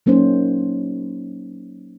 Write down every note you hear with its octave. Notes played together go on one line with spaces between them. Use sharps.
F#3 A#3 C#4 D#4 C5